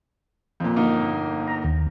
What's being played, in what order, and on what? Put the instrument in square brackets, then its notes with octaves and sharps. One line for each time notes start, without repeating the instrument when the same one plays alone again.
[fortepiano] F2 A#2
[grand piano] G1 A#3 D#4
[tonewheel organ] A#5
D#2